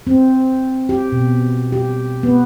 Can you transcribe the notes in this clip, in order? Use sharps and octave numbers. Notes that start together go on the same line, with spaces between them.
C4
G4
B2
G4
B3